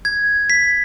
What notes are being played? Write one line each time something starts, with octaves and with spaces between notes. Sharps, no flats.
G#6
B6